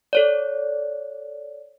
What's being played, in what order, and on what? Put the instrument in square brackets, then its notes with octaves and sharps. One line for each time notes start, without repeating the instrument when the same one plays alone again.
[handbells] A4 C#5 D5